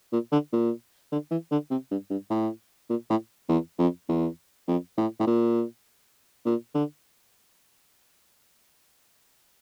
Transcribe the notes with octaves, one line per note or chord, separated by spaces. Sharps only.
A#2
D3
A#2
D3
E3
D3
C3
G2
G2
A2
A#2
A2
E2
F2
E2
F2
A2
A2
A#2
A#2
D3